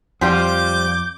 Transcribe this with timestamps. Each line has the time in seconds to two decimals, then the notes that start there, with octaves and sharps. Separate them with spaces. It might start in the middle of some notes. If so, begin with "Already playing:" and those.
0.21 F2 F3 G3 F4 D6 G6